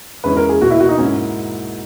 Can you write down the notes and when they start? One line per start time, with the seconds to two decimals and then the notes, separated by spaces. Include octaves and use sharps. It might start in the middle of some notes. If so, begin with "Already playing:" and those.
0.24 E2 C#3 G#3 C#4 E4 B4
0.37 A#4
0.49 G#4
0.61 C#2 B2 A#3 F#4
0.70 E4
0.80 F#4
0.89 D#4
0.98 G#2 F#3 A#3 C#4 E4